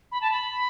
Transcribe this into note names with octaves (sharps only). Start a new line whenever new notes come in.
B5
A5
B5